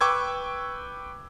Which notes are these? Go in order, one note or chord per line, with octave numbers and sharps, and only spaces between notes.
B4 G5 C#6 D6 E6 G#6